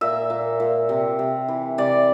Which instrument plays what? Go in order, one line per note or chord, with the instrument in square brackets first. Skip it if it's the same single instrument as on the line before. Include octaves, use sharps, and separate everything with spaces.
[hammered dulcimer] A#2 E5
A#2
A#2
C3
C3
E3
C3 D5